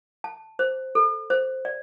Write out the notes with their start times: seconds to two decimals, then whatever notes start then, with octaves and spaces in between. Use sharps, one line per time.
0.24 A5
0.59 C5
0.95 A4
1.30 C5
1.65 D5